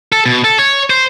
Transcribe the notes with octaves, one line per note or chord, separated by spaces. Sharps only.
A4
B2
A4
C#5
C5